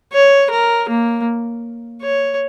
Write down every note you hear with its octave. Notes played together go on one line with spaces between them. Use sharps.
C#5
A#4
A#3
C#5